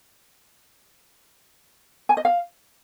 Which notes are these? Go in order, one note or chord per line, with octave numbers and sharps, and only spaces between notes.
G#5
D#5
F5